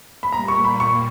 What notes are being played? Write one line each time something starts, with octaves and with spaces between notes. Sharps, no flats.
B5
A#2 G3 A#3 A#5
C#6
B5
C#6